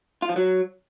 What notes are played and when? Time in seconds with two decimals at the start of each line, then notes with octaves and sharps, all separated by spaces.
0.22 F4
0.29 F3
0.36 F#3